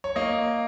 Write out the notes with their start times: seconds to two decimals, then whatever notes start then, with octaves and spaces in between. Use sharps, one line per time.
0.04 C#5
0.16 A#3 D#5